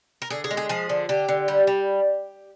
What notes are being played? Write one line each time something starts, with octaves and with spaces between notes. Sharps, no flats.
A#4
D3 G#4
G#4
G#3
G#4
F3 G#4
D3
D3 G4
D3
G3
G3